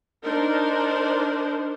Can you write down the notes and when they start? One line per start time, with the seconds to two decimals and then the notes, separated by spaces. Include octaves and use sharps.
0.23 D4 D#4 A#4 C5